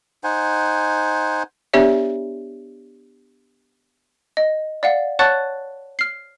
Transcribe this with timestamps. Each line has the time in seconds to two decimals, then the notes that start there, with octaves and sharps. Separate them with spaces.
0.24 D#4 C5 F#5 G#5
1.74 B3 D4 G4 C#5 D5 E5
4.37 D#5
4.83 D5 F5 F#5
5.19 C#5 F#5 A5 C#6 F#6 A6
5.99 F6 C7